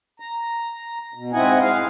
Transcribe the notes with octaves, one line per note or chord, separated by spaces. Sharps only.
A#5
B2
G#2 C4 E4 D#5 F#5 G#5
G#3 F5